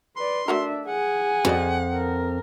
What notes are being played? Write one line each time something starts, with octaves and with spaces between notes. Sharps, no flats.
B4 D5 C6
A3 D4 F#4 A#4 E5
G#4 F#5 G#5
F2 F#4 D5 D#5
A#4